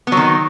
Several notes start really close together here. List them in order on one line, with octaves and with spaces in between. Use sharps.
B3 F#3 D#3